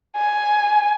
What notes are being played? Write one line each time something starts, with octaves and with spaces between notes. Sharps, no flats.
G#5